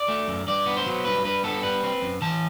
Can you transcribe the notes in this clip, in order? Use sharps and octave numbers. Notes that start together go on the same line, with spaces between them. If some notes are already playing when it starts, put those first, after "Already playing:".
Already playing: D5
A3
F#2
G2 D5
B3
C5
F#3
G2 B4
G2 B4
B3 A4
G3 B4
C4
F#2
E3 A5